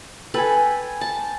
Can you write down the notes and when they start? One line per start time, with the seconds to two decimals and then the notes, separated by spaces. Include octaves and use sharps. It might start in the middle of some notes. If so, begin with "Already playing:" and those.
0.34 A4 B4 G5 G#5
1.01 A5